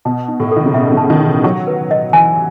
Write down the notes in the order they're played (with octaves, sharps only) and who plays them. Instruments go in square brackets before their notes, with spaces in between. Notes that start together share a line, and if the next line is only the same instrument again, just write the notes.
[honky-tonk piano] B2 [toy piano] A5
[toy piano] D#4
[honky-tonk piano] A2
[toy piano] A4
[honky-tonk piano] D#3
C#3
[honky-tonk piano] B2 [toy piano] E5
[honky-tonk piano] C#3
[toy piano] A5
[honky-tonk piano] D#3
[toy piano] D#4
[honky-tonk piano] E3
[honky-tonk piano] F#3 [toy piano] C#6
[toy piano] B4
D#5
[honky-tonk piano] E3 [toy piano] G#5